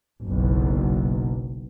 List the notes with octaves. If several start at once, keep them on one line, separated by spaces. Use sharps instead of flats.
F#1 B1